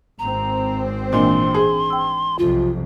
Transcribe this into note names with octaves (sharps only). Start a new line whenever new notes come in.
G#1 C4 A#5
A#2 E3 D4 D#5 C6
G#4
G5 E6
B1 F2 C3 F4